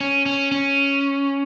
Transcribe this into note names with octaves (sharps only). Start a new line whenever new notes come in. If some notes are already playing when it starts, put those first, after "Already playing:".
C#4
C#4
C#4